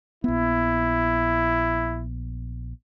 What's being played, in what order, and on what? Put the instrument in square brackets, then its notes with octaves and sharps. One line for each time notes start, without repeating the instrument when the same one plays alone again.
[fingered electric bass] A#1 B3 [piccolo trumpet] E4